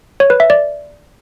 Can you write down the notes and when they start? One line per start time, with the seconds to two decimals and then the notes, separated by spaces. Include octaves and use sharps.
0.20 C#5
0.30 B4
0.40 E5
0.50 D5